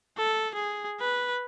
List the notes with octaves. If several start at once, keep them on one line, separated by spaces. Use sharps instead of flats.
A4
G#4
B4